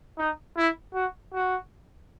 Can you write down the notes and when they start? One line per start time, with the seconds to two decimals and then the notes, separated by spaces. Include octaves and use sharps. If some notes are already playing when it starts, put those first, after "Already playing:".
0.18 D#4
0.57 E4
0.94 F#4
1.33 F#4